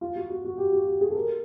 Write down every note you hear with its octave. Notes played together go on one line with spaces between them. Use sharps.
F4
F#4
F#4
F#4
G4
F#4
G4
G#4
A4
A#4